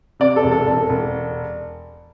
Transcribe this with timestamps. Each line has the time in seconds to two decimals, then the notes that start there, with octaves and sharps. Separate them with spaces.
0.20 C3 D5
0.36 A4
0.44 E1
0.51 A4
0.67 E1
0.89 E1